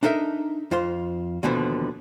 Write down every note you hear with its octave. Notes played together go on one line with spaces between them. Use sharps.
D4 D#4 A4 A#4 E5
F2 F4 C5 C6
D#2 B2 D3 E3 F3 B3